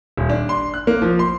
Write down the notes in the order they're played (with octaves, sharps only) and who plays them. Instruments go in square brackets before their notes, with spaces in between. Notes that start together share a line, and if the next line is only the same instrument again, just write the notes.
[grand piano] D#1
D4
C6
F#6
A#3
F3
C6